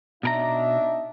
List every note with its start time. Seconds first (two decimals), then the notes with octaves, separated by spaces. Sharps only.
0.23 B2 D4 D#4 A#4 E5 A#5